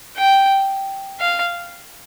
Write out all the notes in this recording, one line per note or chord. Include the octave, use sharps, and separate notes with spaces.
G5
F5